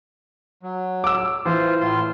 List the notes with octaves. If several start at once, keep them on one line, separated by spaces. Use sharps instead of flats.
F#3
D6 E6
E3 F4 C5
A2 F4 C6